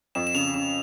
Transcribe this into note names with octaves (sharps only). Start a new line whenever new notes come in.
F2 E7
E7
C#3 F7
C#3 E7